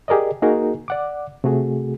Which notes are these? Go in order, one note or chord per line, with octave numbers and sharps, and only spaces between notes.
G4 G#4 A#4 D5 D#5
A#3 D#4 F#4 G#4 A#4
D5 F#5 D6
C3 A3 F#4 G#4